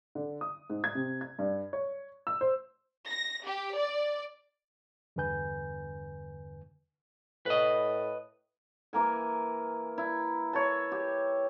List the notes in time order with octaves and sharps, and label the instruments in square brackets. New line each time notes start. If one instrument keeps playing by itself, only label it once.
[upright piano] D3
D#6
G#2
G#6
C3
G#6
G2
C#5
E6
C5
[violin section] A#6
G4
D5
[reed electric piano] E2 G2 D3 B4 G#5 G6
[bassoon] A2 [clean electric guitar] B4 D#5
[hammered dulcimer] E3 A#3 A#4 G#5
E4
C#5 A5
G4